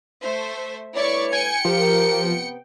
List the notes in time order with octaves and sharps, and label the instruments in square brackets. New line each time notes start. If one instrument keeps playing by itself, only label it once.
[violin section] A3 C5 E5
[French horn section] G2 A3 B4 [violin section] E4 D5 C#6 [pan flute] C#5
[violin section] G5 C#7 [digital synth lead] G#5
[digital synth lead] F3 [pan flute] G4 [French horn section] A#4
[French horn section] C3 B3